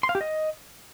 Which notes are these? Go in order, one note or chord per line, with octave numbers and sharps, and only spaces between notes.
C6
F5
G4
D#5